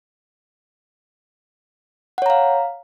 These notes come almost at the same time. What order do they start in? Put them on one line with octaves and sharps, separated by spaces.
F#5 C#5 A#5 F5